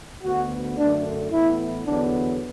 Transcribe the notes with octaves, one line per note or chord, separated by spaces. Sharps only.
D2 D3 B3 F#4
F#2 D3 A3 D4
A2 E3 B3 E4
E2 D3 F#3 B3 D4